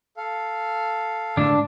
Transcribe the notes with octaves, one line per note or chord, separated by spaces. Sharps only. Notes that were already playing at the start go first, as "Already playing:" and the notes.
A4 F5
A2 D3 G#3 D4